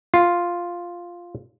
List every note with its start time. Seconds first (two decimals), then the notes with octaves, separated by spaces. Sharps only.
0.14 F4